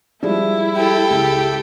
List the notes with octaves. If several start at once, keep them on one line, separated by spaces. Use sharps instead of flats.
F3 G3 G#3 E4
G4 A4
C#2 G#3